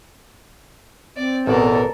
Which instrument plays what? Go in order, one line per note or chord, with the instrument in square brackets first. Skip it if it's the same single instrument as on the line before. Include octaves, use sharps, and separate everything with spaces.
[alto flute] C4 [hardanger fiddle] D5
[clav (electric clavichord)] A1 B2 D5 [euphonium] E2 [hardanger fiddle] A4 A#4